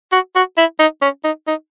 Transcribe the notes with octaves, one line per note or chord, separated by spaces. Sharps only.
F#4
F#4
E4
D#4
C#4
D#4
D#4